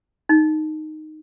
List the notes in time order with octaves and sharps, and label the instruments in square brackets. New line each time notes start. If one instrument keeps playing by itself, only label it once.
[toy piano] D#4